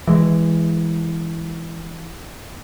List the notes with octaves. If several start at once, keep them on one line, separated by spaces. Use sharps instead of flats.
E3 G#3